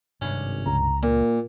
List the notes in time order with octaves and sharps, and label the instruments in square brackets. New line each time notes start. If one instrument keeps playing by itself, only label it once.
[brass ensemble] G#1 [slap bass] G2 C3 [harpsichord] C#4
[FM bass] C#2 [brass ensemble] A#5
[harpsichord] A#2 [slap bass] A#3 [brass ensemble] F4 A#4